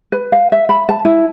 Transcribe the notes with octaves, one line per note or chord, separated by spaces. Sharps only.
B4
F5
E5
B5
A5
E4